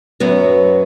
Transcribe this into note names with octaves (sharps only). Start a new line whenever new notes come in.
F#2 F#3 B3